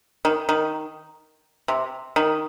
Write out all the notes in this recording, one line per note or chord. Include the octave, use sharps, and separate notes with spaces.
D#3
D#3
C3
D#3